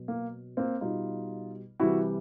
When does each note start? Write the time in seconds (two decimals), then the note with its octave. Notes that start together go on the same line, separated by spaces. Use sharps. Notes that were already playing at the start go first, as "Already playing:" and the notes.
Already playing: B2 F#3
0.08 A#3
0.57 A#3 C4
0.81 B2 G3 D#4 F4
1.80 C3 E3 G3 E4 F#4